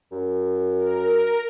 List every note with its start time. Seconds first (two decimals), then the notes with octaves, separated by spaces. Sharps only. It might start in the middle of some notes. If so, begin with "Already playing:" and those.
0.12 F#2
0.77 A#4